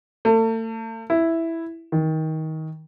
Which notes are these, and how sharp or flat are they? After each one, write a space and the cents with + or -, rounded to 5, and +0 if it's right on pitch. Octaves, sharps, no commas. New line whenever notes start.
A3 +40
E4 +0
D#3 +20